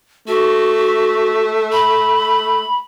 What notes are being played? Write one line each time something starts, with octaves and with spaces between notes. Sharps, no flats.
A3 F#4
B5